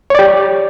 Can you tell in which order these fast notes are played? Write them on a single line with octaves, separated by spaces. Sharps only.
C#5 D5 G4